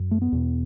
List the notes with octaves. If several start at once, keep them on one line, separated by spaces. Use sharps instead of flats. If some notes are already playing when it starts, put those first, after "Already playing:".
Already playing: F#2
A3
B3
E2 B2